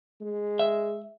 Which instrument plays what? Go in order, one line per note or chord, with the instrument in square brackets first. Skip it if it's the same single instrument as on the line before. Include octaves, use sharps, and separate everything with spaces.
[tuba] G#3
[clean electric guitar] E5